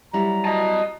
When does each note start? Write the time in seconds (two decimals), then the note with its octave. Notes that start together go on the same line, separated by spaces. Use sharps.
0.13 F#3 G3 E4 A#5
0.45 D#5 A5